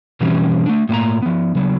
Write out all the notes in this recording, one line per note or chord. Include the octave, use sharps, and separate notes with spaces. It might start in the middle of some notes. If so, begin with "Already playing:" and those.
B2 E3 G3 C4 C#4
A3 D4
A2 A#3 A5 A#5
F3 B3
C#3 F#3 B3